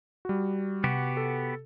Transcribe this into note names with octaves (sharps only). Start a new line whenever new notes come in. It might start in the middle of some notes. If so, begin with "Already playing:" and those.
G3 F#4
C3 B3 F#4 G4
A4